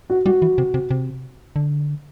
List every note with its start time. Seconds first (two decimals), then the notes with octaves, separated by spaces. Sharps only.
0.10 F#4
0.26 G3 F#4
0.42 E3
0.58 C3
0.74 C3
0.91 C3
1.56 D3